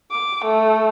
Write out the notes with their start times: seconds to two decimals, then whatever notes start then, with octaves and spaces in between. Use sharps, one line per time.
0.11 D6
0.44 A3